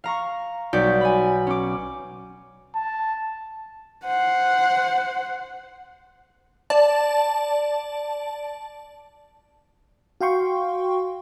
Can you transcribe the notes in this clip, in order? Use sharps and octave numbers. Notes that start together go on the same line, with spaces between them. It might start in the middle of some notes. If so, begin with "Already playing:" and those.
F5 A#5 C#6
B1 G3 F#4 D5 G6 B6
G#5 B5
C#4 D6
A5
C5 F#5
D5 A5
F#4 F5 G5 C6 C#6